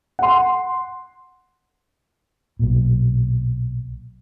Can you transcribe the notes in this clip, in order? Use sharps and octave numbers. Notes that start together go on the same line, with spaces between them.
F#5 C6
B1 A#2